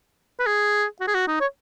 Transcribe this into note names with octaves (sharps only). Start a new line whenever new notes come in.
B4
G#4
F#4
G#4
F#4
D#4
C#5